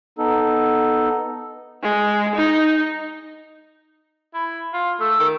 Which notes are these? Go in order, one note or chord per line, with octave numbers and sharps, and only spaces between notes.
B3 D#4 A4
G#3
D#4
E4
F4
A3 E6
D#3